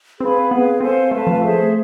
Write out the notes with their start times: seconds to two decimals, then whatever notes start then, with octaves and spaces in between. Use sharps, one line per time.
0.20 C4 G#4 B4 F5 B5
0.50 B3 G#4 B4 F5
0.81 C4 A4 C5 F5 G#5
1.11 A3 B4 F5 A5
1.27 F3
1.42 A3 G#4 C5 E5